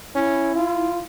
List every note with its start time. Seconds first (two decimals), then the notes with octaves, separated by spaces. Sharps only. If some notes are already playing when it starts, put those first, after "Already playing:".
0.15 C#4 E4
0.55 F4